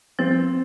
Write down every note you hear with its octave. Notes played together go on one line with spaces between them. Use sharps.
F3 C4